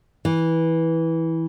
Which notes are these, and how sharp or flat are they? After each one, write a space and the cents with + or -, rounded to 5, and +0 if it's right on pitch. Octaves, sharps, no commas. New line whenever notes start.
E3 -15